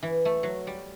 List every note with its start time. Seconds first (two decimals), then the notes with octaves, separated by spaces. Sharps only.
0.03 E3
0.25 A3
0.43 F#3
0.67 G3